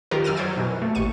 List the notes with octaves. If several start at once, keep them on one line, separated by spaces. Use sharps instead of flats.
D#3 F4 G4 A#4
F#2 E6 F6 A6 D#7
F#3 C5 G#6 D7
F#2 B2 E3
A3
A1 D#2 C#6 D#7